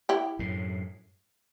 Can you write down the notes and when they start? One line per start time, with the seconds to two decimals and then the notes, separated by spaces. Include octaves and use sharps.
0.09 E4 G4
0.39 F#2 A2